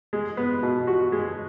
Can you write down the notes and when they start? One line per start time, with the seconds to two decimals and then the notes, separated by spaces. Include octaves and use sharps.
0.13 G#3
0.37 B3
0.63 B2
0.87 F#4
1.12 G#3